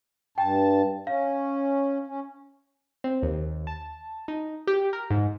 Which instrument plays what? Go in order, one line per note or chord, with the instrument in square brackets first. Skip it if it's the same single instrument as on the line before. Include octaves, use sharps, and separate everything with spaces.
[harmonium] G2 A5 [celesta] G5
[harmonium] C#4 [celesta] F5
[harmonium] C#4
[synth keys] C4
D#2
A5
D#4
G4
A#4
G#2